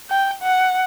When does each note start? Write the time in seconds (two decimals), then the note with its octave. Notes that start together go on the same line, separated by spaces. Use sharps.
0.10 G5
0.43 F#5